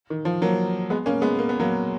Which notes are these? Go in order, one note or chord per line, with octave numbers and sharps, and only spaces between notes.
D#3
F3
F#3 A#3
G#3 B3
A#3 C#4
G#3 B3
A#3
B3
F#3 A#3